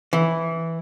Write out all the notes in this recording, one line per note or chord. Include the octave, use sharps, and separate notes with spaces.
E3